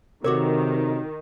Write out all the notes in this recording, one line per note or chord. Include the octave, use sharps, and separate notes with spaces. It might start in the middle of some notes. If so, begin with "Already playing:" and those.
C3 D#3 F#4 A4 A#4 C#5 D6